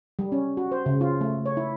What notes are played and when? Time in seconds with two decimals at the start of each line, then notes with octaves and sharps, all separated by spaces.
0.19 G3
0.32 C#4
0.57 F#4
0.72 C5
0.86 C#3
1.01 F4
1.21 A3
1.46 C#5
1.57 E4